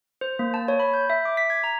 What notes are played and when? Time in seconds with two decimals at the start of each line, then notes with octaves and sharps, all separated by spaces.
0.21 C5
0.39 A#3
0.54 A5
0.68 C#5
0.80 B5
0.93 G6
1.10 E5
1.25 D6
1.37 B6
1.50 G#6
1.64 A#5